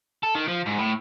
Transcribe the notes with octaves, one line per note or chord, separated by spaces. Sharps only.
A4
D#3
F3
G#2
A2